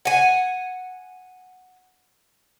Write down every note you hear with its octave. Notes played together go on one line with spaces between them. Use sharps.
F#5 G#5